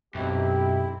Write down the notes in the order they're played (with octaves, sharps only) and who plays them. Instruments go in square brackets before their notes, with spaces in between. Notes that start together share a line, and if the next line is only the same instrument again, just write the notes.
[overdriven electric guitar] B1 [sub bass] F#2 [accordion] C4 E4 [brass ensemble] G4